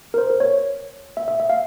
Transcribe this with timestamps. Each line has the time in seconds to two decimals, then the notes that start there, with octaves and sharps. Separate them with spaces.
0.14 A#4
0.18 C5
0.30 A#4
0.40 C#5
1.17 E5
1.28 E5
1.40 E5
1.50 F5